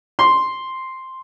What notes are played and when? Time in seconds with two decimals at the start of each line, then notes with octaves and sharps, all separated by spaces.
0.19 C6